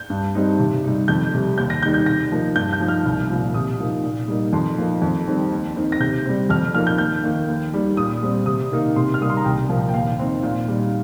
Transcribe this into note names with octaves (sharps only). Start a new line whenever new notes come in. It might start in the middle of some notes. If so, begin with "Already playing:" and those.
Already playing: G6
G2
G3 C4 D#4
C3
G3 D#4
F2 G6
C3 G3
D#2 G6
A#6
D#3 G3 D#4 G6
G6
C3 A#6
F3 A#3 D#4
G2 G6
G6
F3 D#4
F6
C2
A#2 F3
C3 D#6
F3 A#3 D#4
A#2
G3 A#3 D#4
F2 C6
F3 A#3 D#4
F2
D#3 G3 C4
D#2
D#3 C4 D#4
A#6
C3 G6
G3 C4
F2 F6
F3 A#3 D#4 F6
G6
D#2 G6
D#3 A#3 D#4
D#2
D#3 G3
A#2 D#6
G3 C4
C3 D#6
D#3 A#3 D#4
C3 C6
F6
G3 A#3 D#4 D#6
C6
A#5
C2 G5
A#2 F3 A#3
G5
D#2 F5
D#3 C4 D#4
A#2 F5
G3 D#4